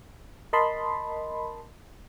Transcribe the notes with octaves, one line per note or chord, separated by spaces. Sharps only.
A#4 D#5 A5 B5 C6